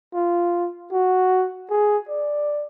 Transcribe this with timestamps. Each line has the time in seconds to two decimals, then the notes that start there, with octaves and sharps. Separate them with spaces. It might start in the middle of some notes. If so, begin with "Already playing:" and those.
0.14 F4
0.92 F#4
1.70 G#4
2.09 D5